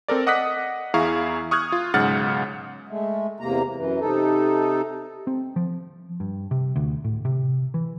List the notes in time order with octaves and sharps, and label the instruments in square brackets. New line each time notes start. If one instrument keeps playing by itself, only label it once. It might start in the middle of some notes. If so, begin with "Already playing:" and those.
[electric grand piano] C4 A4 A#4 D5
D#5 F#5 D6 D#6 F#6 B6
E2 E4 G#4 F5 A#5 C#6
C#6 D#6 F6 F#6 G#6
F4
B1 G#2 C#3 F#5 F6 A6
[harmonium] G#3 A3
E2 C3 A#3 A#5
F#2 E3
C3 D#4 A4
[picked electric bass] C4
F3
G2
C3
D2
A2
C3
E3